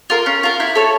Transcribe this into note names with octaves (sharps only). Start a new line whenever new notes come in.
F4 A#4
C#4
F4 A#4
E4
A4 C#5